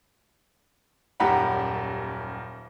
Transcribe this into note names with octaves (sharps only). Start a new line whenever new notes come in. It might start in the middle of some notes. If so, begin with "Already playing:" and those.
D#1 F#2 G4 F#5 A#5 B5